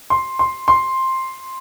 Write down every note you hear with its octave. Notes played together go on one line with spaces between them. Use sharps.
C6
C6
C6